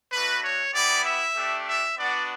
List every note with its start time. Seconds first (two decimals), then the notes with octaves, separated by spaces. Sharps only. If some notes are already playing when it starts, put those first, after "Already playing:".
0.12 A3 D4 F#4 B4
0.43 C#5
0.74 B3 E4 G4 D5
1.04 E5
1.35 A3 D4 G4
1.67 E5
1.98 B3 D4 F#4 D5